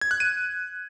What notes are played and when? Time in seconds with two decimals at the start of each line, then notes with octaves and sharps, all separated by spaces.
0.01 G#6
0.11 F#6
0.20 D#7